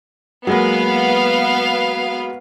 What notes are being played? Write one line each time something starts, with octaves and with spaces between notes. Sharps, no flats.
F#3 G#3 A#3 B3 F5